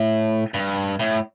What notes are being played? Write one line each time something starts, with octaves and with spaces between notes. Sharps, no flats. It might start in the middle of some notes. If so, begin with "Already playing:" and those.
Already playing: A2
G2
A2